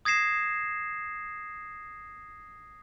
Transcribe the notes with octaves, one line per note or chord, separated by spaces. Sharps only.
D#6 G#6 A#6 C7 E7